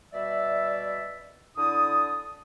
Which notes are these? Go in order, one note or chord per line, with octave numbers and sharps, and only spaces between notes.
B2 G3 D5 E5
D3 E4 D5 D#6